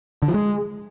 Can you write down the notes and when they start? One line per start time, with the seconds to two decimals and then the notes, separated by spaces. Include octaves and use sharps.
0.22 D3
0.28 F3
0.34 G#3